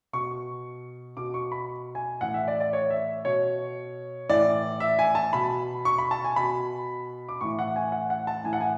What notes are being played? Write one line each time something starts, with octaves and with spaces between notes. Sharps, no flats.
B2 C#6
B2 D6
C#6
B5
G#5
A2 E3 F#5
E5
D5
D5
C#5
E5
B2 C#5
A2 E3 D5
E5
G#5
A5
B2 B5
C#6
B5
A5
G#5
B2 B5
D6
A2 E3 C#6
F#5
G#5
F#5
F#5
A5
A2 E3 G#5
F#5
G#5